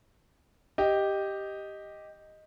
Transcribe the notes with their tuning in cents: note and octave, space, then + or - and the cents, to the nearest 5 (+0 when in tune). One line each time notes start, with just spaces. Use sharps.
G4 +0 D#5 +0